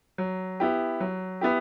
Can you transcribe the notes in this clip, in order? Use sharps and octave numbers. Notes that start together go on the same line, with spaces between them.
F#3
B3 E4 G4
F#3
B3 E4 G4